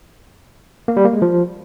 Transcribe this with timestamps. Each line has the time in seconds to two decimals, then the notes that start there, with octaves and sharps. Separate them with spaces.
0.88 A#3
0.97 G3
1.05 A#3
1.13 G#3
1.22 F3